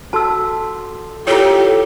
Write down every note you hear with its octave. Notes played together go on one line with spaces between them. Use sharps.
F#4 A4 A5 C6 E6
E4 F4 G4 A4 C#5